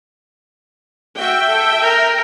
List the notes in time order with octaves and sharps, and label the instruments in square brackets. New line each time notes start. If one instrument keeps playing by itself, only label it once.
[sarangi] F#4 [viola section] E5 G5
[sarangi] A4
A#4